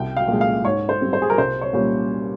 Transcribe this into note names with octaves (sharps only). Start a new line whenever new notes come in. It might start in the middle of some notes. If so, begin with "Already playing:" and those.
Already playing: C2 G5
F5
A#2 G#3
F5
G#2 C#5
C5
G3 C4
C5
G#4
A#4
C2 C5
C#5
A#2 G3 C#4